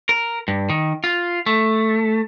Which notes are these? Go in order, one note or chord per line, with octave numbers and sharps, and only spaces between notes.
A#4
G2
D#3
F4
A3